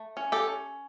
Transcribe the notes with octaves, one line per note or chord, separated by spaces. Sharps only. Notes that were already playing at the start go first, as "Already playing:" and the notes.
Already playing: A3
C#4
G4 A4
C#4